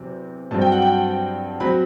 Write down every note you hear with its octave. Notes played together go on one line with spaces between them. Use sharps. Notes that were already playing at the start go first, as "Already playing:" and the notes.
Already playing: E2 C3 F#3 C4
G2 F#3 C4 A5
G5
F#5
G5
F#3 C4 B5